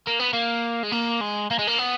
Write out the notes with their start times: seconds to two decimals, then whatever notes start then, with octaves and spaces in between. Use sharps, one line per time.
0.07 A#3
0.20 B3
0.33 A#3
0.83 G#3
0.92 A#3
1.21 G#3
1.51 A#3
1.59 G#3
1.67 A#3
1.79 B3